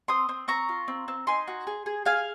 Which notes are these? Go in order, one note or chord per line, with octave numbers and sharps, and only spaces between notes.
C4 C6 D#6
C4
C4 A#5 C#6
F4
C4
C4
D#4 G#5 C6
F#4
G#4
G#4
G#4 F5 G#5